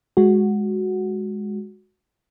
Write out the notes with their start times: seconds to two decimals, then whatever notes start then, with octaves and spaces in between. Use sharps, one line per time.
0.17 G#3 F#4